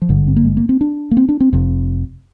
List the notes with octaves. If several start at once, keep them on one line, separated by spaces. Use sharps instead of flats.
F3
G#1 G2 D3 G3
C4
A#3
G#3
A#3
C4
D4
A#3
C4
D4
C4
F1 F2 C3